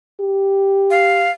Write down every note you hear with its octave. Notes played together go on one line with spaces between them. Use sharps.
G4
F5